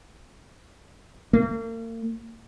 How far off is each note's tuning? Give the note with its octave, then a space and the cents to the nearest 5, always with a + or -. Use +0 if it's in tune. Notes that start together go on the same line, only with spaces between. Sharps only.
A#3 -40